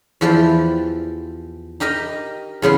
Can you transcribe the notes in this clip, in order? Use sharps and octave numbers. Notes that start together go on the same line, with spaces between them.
E2 E3 F3 G4 D5
D#4 G4 A#4 D#5
E2 C#3 B3 C6